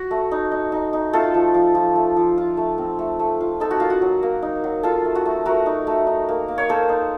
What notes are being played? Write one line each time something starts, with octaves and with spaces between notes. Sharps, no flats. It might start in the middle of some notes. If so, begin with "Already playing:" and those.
Already playing: F#4
A3
D#4
D#4
D#4
D#4
A3 F4 A4
F3
F3
F3
A3
F3
F4
A3
C4
A3
A3
F4
D#4 A4
F#4
A#3 F4
F#4
F#3
A#3
D#4
F#3
D#4 F4 A4
A3
F#4
A3
A3 F#4 A#4
D#4
A3
D#4
A#3
A#3
C#5
A#3 A4 C5
D#4